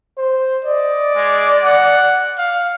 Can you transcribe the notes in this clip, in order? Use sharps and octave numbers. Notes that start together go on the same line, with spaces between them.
C5
D5 D#5
G#3
F#5
F5